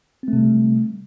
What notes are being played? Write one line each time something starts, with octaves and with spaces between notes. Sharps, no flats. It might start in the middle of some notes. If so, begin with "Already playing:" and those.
C3 G3 A3 C4